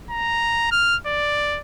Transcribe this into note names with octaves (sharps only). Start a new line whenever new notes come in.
A#5
F6
D5